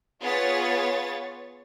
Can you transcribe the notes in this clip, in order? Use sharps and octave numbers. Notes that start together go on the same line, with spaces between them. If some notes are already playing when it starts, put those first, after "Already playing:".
B3 F4 G#4 C#5 A6